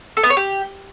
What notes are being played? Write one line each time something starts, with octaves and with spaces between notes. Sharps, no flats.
A4
B3
C#5
G4